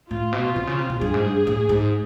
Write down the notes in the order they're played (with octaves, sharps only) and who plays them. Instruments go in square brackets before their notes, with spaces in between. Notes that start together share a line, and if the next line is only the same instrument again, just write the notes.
[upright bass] A2 [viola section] F4
[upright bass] B2
C3
C#3
C3
B2
[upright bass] G2 [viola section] G#4
[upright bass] G#2
G2
A2
G#2